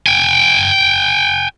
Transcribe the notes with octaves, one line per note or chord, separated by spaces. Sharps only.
G5 G#5